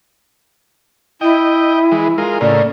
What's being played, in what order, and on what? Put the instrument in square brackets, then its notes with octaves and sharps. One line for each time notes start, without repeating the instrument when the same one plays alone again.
[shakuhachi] E4 [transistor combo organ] D#5 G5
[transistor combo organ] E3 G#3
G#3 F4 A#4
[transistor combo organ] A2 C#3 A#3 [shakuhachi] D5